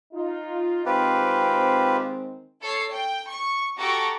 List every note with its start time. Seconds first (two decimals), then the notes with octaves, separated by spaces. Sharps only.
0.13 D#4 F4
0.86 D#3 G#3 C4 F4 G4 B4
2.61 A4 C#5 C7
2.92 G5
3.30 C#6
3.77 F#4 G4 A4 A#5 C#6 D6